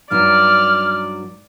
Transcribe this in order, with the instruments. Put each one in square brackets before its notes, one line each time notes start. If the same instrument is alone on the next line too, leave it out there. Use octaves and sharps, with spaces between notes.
[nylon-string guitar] G2 F#3 D#4 [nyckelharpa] D5 [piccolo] F6